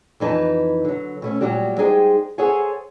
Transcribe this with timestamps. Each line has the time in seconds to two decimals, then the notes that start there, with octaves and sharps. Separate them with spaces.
0.20 F2 E3 D#4 B4 A5
0.85 D3 F#3
1.22 B2 A3 C#4
1.41 A#2 F#3 G3 F#4 G4
1.77 G3 G#3 D#4 G#4 C5 G5
2.38 G#4 A4 C5 C#5 F#5 G#5